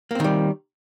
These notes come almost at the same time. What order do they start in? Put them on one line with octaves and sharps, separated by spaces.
A#3 C4 D#3 G3